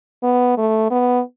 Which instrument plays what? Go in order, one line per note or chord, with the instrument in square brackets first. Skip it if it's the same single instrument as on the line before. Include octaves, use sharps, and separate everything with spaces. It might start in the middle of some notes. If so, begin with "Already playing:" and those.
[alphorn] B3
A3
B3